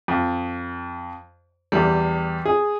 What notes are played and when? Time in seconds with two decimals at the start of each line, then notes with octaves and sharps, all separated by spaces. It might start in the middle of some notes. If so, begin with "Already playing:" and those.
0.08 F2
1.72 E2 G3
2.45 G#4